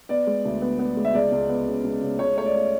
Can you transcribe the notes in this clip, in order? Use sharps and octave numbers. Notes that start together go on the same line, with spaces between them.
B3 D5
G#3
D2
B3
B3
G#3
E5
C#2 D5
C#2
B3
C#3
C#2
C#3
C#2 C#5
A3 C#5
D5
A3